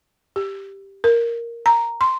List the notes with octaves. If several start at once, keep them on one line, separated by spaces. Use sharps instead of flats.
G4
A#4
A#5
C6